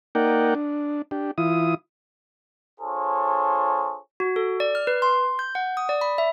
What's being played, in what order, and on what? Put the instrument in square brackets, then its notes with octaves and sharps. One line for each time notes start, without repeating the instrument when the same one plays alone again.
[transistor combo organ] A#3 D#4 A#4 D5 F#5 G5
D4
D4 G4
E3 E4 F4 D#6
[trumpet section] D4 F4 G#4 A4 C5 C#5
[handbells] F#4
A4
D5
F6
B4
C6
G6
F#5
D#6
D5
B5
E5